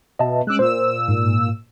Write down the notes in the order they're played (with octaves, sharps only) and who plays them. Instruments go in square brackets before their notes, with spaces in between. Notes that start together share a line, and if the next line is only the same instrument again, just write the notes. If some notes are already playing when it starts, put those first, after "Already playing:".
[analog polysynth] B2 [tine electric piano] D#5 E5 A5
[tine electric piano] G#3 C#4 [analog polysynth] D6 E6 F#6
[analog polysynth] A#2 E6 [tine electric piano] C5
[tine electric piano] G#2